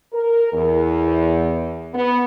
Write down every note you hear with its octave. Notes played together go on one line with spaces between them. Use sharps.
A#4
E2
B3